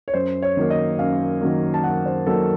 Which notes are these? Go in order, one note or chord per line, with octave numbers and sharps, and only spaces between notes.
C#5
F#2 C5
C#5
D#3 F#3 A#3
D#5
F#2 F5
D#3 F#3 A#3
A5
F#2 F#5
C5
D#3 F#3 A#3 A4